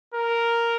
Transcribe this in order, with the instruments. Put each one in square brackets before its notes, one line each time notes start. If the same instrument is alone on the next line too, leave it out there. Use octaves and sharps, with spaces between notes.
[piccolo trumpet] A#4